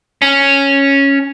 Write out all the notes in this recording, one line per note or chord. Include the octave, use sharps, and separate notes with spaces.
C#4